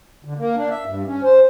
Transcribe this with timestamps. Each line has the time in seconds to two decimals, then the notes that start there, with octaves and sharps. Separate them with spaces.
0.25 D3
0.37 A#3
0.55 D4
0.70 E5
0.85 G2
1.06 C#4
1.23 C5